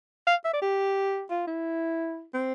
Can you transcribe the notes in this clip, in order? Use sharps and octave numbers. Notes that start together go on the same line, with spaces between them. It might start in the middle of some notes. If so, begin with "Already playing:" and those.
F5
E5
D5
G4
F4
E4
C4